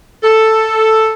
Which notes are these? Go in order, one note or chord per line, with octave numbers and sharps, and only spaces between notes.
A4